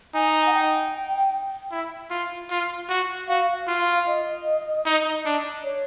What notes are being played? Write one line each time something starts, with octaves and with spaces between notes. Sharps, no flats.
D#4 G#5
F#5
G5
E4
F4
F4
F#4
F#4 F5
F5
F4
F5
D#5
D#4
D4
C#5